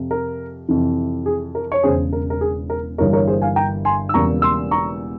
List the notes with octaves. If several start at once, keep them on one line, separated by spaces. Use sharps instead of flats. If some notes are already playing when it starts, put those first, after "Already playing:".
Already playing: F2 C3 F3
A#4
F2 C3 E3
G#4
A#4
C#5
E1 E2 C#3 G#4 C5
A#4
A#4
G#4
A#4
G1 G2 E3 G3 A#3 A#4 C#5
A#4 C#5
G#4 C5
F5 G#5
G5 A#5
G#5 C6
E6
E1 E2 C#3 G3 A#3 A#5 C#6
C6 E6
A#5 C#6